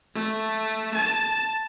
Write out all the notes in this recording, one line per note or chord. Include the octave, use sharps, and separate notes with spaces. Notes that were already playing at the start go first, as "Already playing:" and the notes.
A3
A5